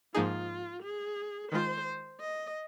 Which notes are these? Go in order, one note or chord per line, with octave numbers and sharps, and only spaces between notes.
G#2 F3 A#3 D#4 F4 G#4
G#4
D#3 G#3 F4 C5
D#5